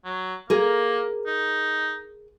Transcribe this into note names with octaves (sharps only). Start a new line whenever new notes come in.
F#3
A#3 G#4 A#4
D#4